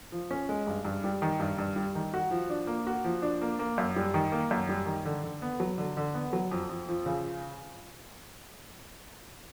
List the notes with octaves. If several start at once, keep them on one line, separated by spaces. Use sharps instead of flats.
F3
C#4
G#3
G2
G2
G3
D#3
G2
G2
G3
D#3
F#4
F3
D4
A#3
F#4
F3
D4
A#3
A#3
F#2
G3
D#3
A#3
F#2
G3
D#3
D3
D3
B3
F#3
D3
D3
B3
F#3
F2
F2
F3
C#3